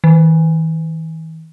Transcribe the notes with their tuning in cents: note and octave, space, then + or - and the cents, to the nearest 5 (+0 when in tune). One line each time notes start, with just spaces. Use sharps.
E3 -45